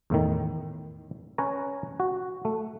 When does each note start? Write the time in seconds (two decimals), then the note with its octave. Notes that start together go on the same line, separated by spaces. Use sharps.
0.10 E2 A2 D#3
1.38 C#4 B4 C#5 A#5
2.00 F#4
2.45 A3